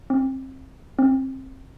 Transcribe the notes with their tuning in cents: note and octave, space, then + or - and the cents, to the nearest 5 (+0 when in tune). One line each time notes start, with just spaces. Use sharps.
C4 +25
C4 +25